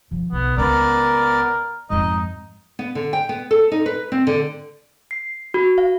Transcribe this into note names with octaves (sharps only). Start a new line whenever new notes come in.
D#3 F3
B1 B3
C#2 B3 A#4 D5
F2 G#2 D#4 D#5
B3
D3
G5
B3
A4
D#4
B4
C4
D3
C7
F#4
F5